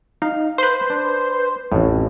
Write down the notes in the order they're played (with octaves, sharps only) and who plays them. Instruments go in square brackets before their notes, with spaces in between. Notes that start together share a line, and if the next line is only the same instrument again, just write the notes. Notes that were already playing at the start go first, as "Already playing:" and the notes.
[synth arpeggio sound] D#4 [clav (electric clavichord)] F5
[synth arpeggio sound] B4 C5
[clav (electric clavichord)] D4
[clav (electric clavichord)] A1 A2 [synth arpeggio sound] F2